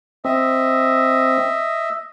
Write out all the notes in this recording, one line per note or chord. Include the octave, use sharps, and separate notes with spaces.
C4 D#5 E5